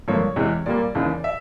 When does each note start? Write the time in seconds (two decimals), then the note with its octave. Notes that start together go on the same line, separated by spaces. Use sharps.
0.08 G2 D3 F3 A#3 C#5
0.36 E2 C3 E3 G#3
0.66 A#2 G3 A#3 D5
0.95 D#2 C#3 E3
1.24 E5